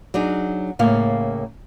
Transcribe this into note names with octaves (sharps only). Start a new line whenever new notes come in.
F#3 D4 D#4 G#4
A2 C#3 A#3 F5